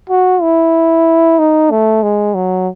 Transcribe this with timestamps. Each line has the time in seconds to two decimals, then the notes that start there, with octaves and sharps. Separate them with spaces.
0.10 F#4
0.42 E4
1.39 D#4
1.71 A3
2.03 G#3
2.35 F#3